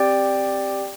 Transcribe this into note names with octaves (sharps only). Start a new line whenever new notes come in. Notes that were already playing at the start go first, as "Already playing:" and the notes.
Already playing: C4 G4 D5 G5